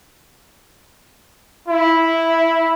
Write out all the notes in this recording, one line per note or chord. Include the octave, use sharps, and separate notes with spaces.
E4